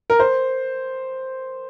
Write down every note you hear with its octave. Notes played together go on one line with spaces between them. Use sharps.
A#4
C5